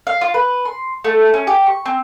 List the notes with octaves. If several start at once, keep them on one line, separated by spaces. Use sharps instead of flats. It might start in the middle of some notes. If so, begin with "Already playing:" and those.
F5
F4
B4
C6
A3
C#4
G4
C#6
C4